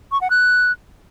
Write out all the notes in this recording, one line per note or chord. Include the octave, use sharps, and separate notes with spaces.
C#6
F#5
F#6